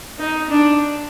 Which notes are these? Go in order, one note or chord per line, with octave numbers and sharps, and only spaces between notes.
D#4
D4